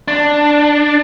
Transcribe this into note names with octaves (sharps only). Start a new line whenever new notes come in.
D4